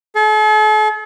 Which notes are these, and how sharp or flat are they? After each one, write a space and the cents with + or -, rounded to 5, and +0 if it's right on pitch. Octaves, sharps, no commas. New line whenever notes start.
A4 -45